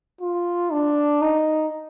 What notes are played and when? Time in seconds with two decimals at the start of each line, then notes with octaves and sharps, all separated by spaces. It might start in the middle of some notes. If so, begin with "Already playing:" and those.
0.21 F4
0.72 D4
1.21 D#4